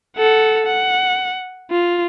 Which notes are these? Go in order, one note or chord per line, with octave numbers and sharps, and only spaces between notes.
A4 F#5
F#5
F4